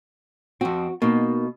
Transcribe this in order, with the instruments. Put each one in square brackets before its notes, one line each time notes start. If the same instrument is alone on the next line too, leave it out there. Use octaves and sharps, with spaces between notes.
[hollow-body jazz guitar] F2 C4 [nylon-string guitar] F#4
[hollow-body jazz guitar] B2 [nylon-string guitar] A#3 D#4